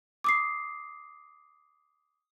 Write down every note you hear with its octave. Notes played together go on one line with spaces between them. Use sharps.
D6 D#6 C7